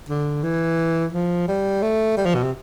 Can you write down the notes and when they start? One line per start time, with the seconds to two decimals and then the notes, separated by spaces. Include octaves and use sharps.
0.09 D3
0.43 E3
1.13 F3
1.48 G3
1.82 A3
2.17 G3
2.25 F3
2.35 B2
2.43 C3